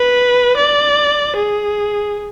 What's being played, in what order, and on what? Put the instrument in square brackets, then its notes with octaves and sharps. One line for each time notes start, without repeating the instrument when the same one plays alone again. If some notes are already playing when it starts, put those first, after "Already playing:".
Already playing: [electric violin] B4
D5
G#4